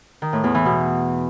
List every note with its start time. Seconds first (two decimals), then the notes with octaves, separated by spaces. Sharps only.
0.22 D#3
0.33 A2
0.44 E2
0.55 E3
0.65 B2